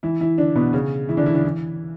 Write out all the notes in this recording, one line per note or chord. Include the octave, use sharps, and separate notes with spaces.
E3 E4
E3 E4
D3 D4
B2 B3
C#3 C#4
E3 E4
D3 D4
E3 E4
D3 D4
E3